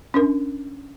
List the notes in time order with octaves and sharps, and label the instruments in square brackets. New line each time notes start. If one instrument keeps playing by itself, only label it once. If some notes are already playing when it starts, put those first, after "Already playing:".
[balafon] C#4 D4 A#4